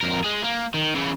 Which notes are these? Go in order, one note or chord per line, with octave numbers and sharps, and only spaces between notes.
F2 A#4
G#3 G#4
A#3
D#3
C#3 E3